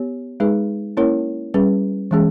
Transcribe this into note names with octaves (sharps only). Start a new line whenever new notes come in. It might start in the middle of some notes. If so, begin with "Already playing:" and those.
Already playing: B3 G4 C#5
G#3 D#4 G#4 B4
A#3 C#4 E4 A#4 C#5
G3 C#4 G#4 B4
E3 G#3 C#4 G#4